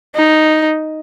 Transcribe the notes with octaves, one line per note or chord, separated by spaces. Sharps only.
D#4